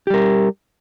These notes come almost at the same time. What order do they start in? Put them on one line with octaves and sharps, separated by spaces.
G4 G3 A#4